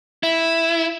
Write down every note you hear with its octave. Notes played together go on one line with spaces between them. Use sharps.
E4